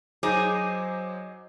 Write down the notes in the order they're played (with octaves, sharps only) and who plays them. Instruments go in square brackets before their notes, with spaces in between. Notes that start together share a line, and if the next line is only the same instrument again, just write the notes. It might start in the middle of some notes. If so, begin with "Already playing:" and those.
[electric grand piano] F#3 C5 D6 [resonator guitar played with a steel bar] D#4 G#4